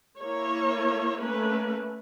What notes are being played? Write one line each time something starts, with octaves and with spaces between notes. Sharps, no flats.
A#3 E4 C#5
A3 A#3 C#4 B4